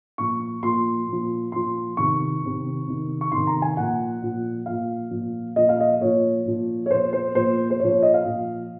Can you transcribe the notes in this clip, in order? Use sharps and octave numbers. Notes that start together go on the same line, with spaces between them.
A#2 F3 C#6
A#2 F3 C6
A#2
F3
A#2 F3 C6
C3 D#3 C#6
C3 D#3
C3 D#3
C#6
C3 D#3 C6
A#5
G#5
A#2 F3 F#5
A#2 F3
A#2 F3 F5
A#2 F3
A#2 F3 D#5
F5
D#5
A#2 F3 C#5
A#2 F3
C#5
A#2 F3 C5
C5
A#2 F3 C5
C5
A#2 F3 C#5
C#5
D#5
F5
A#2 F3